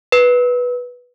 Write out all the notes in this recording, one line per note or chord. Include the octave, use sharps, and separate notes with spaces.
B4